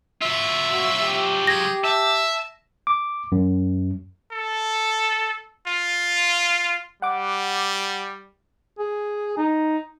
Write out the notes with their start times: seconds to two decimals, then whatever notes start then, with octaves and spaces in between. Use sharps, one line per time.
0.22 F#3 F4 E5
0.71 F#4
1.01 G4
1.47 G#4 A#6
1.84 E5 A5
2.87 D6
3.32 F#2
4.32 A4
5.67 F4
7.02 G3 F#5 D6
8.79 G#4
9.37 D#4